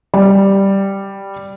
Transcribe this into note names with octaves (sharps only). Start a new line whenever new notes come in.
G3